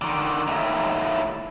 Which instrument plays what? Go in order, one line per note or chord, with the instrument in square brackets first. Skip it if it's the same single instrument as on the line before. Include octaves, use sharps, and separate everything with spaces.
[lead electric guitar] D3 D#3
D#2 A2